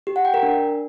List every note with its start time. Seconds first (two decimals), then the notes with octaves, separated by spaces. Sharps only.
0.07 G4
0.16 F#5
0.25 G5
0.34 A#4
0.43 D4